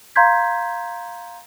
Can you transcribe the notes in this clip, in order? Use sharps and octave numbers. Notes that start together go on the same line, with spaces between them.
F5 A#5 C6 G6 G#6 B6